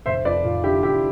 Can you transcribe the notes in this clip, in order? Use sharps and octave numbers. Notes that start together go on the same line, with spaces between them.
F1 C5 E5
F2 B4 D5
F1 F4
D3 E4 G4
F1 E4 G4